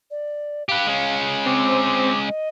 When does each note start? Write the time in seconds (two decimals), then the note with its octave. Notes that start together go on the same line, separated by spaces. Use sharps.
0.11 D5
0.69 G4 B4 F5
0.86 G#3 C#4
1.46 C4 D6
2.28 D#5